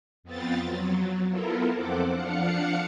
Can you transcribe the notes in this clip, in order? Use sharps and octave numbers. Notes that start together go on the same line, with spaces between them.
F2 B3 C4 F4 A6
F#3
B3 E4 F4 A4 A#4
F2 C4 A4 C5 F#5 D6
F3 D4 F5 F#5 C#7